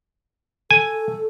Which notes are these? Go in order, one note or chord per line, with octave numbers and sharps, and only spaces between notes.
A4 G#5